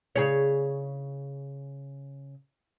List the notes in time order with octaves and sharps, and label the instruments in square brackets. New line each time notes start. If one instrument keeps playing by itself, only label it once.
[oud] C#3 G#4 C#5